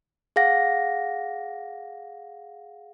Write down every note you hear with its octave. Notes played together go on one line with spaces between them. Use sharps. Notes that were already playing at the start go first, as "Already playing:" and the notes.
G#4 F5 F#5 A#6